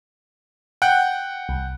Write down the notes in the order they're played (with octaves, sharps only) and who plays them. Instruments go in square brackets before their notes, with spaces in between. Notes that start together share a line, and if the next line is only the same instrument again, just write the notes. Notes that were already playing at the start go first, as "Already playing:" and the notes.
[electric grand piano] F#5 G5 F#6
[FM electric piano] C2